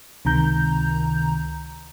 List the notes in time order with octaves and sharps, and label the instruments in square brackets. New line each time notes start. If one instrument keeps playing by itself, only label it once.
[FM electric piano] C#2 C3 D#3 A#5 G6